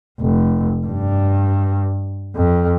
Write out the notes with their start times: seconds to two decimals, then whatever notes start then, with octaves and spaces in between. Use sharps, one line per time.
0.20 F1
0.86 G2
2.35 F2